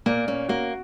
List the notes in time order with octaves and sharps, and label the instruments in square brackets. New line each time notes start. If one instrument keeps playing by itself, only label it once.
[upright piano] A#2 [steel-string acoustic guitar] A#3
[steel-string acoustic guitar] A#3 [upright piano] C#4
[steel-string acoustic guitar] A#3 [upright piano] F#4